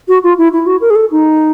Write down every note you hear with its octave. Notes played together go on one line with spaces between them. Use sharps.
F#4
F4
E4
E4
F#4
A#4
G#4
A4
D#4